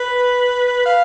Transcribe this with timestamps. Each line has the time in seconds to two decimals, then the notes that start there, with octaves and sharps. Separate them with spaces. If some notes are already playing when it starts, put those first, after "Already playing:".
Already playing: B4
0.86 F5